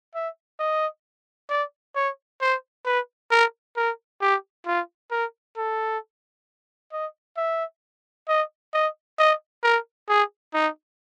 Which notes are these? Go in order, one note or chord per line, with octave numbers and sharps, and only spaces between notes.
E5
D#5
D5
C#5
C5
B4
A#4
A#4
G4
F4
A#4
A4
D#5
E5
D#5
D#5
D#5
A#4
G#4
D#4